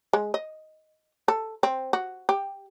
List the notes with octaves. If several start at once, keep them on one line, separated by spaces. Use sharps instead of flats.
G#3
D#5
A4
C4
F#4
G4